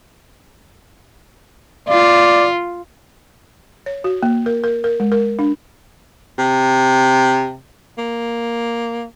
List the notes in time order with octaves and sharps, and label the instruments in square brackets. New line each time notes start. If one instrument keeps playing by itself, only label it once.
[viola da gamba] F4 [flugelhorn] D5
[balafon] C#5
F#4
A#3
A#4
A#4
A#4
G#3
A#4
D4
[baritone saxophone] C3
A#3